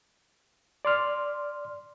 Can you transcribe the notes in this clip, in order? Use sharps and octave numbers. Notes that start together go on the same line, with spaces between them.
D5 C6 F6